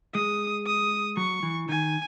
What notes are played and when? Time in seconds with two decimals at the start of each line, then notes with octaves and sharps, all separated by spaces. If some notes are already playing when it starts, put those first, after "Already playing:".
0.14 G#3 D#6
0.67 D#6
1.17 F#3 C#6
1.43 E3
1.69 D#3 G#5